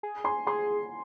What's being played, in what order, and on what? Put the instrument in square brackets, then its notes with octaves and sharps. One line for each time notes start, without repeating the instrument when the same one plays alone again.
[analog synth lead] G#4
[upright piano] G#5 C6
[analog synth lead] G#4 [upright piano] G#5 C6